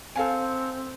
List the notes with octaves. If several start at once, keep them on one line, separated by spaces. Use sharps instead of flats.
C4 A4 F5 G#5